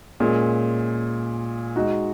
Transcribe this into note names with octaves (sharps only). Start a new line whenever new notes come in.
A#2 G#3 C#4 G#4
G#3 D#4 F#4